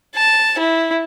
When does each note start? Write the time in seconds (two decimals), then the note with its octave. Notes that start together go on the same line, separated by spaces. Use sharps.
0.16 A5
0.59 E4